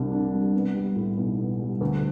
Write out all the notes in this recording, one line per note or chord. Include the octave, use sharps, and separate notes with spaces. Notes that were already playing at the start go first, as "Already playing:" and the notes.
Already playing: C2 C3 G3 D4
D4
G3
B3
G3
A2
B1
B3
G3
D2